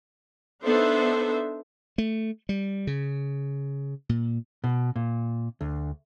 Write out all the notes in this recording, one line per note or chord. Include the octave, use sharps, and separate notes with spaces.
B3 D4 D#4 A4 C5 E5
A3
G3
C#3
A#2
B2
A#2
D2